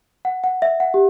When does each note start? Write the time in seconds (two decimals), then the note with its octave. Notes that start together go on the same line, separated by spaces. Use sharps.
0.25 F#5
0.44 F#5
0.62 E5
0.80 F#5
0.94 G4